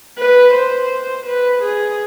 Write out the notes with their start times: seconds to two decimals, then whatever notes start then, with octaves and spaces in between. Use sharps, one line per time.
0.19 B4
0.54 C5
1.26 B4
1.63 G#4